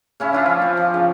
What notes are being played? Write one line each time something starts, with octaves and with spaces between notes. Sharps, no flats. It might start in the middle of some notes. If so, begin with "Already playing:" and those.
C#3 C#4 E4
D4 E4 F4
F3
C4
F3
C#3